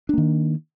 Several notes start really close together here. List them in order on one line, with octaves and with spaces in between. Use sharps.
D4 A#3 D#3